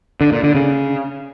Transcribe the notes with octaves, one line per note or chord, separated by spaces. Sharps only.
D3
A#2
D3
C#3